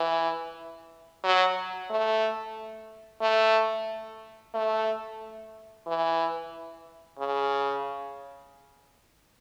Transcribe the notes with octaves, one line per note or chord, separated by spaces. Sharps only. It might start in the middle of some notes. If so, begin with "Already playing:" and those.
Already playing: E3
F#3
A3
A3
A3
E3
C#3